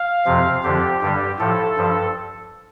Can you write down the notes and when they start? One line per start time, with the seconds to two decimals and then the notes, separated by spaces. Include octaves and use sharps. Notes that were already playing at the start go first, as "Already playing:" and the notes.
Already playing: F5
0.25 F2 C3 F3
0.63 F2 D3 F3 G4
1.01 G2 D3 G3
1.39 A2 F3 A4
1.77 G2 F3